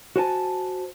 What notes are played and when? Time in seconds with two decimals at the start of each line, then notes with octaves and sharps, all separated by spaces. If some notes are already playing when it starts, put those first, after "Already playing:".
0.16 F#4 C5 G#5 A5